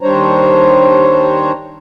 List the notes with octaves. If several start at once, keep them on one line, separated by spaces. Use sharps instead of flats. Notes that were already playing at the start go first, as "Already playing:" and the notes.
D#2 G3 D4 C5 C#5 A#5